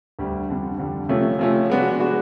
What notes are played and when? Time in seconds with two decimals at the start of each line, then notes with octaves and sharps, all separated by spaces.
0.19 D2 D3 G3
0.49 F2 D3 G3
0.78 F2 D3 G3
1.09 C3 F3 A3 C#4
1.39 C3 F3 A3 C#4
1.70 G#3 B3 D4 F#4
2.00 G#3 B3 D4 F#4